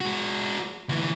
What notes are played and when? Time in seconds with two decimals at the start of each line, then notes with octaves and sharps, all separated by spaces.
0.01 G#3 F#4
0.89 D2 E3